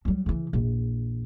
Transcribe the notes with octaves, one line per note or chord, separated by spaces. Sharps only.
F#3 G3
C#3 E3
A#1 E2